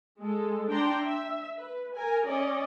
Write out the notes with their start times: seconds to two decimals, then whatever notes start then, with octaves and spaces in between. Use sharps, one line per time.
0.19 G#3 A4
0.69 D4 G5 A#5 C6
1.01 E5
1.58 B4
1.93 A#4 G#5
2.26 C#4 D5 D#5